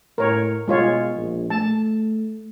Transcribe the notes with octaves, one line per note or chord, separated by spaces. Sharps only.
A2 A#4 C#5
B2 G#3 F4 C#5
A#1
A3 A5